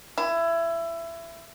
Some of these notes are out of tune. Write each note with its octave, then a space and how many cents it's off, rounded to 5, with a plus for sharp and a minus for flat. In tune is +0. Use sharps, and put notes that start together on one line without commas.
E4 +20